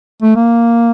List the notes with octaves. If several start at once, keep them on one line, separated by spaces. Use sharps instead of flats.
A3
A#3